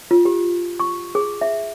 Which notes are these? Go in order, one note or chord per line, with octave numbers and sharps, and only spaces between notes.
F4
G4
C#6
G#4
E5